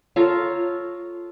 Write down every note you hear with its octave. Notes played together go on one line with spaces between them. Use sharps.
F4 A4 A#4 C#5